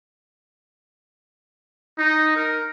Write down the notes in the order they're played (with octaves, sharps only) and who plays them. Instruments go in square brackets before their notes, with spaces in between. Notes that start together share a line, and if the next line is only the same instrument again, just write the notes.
[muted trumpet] D#4
A#4